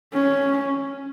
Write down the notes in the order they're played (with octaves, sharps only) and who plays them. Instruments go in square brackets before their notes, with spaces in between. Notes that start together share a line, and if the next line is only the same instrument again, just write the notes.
[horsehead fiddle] C#4